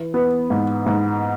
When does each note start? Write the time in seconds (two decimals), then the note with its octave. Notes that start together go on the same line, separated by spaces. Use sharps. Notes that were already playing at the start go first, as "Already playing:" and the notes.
Already playing: E3
0.14 B3
0.50 G#2
0.86 G#2